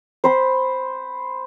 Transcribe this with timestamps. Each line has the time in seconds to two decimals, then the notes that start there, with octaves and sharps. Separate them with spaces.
0.24 C5 B5 C6